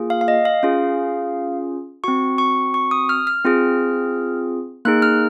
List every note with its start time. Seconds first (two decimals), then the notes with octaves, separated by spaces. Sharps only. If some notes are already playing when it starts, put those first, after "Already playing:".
Already playing: A#3 F4 G#4
0.10 F5
0.21 F5
0.28 D#5
0.45 F5
0.63 C#4 F4 G#4
2.04 C4 F#4 C#6
2.38 C#6
2.74 C#6
2.91 D#6
3.09 F6
3.27 F6
3.45 C4 F4 G#4
4.85 A#3 D#4 G#4 F#6
5.02 F6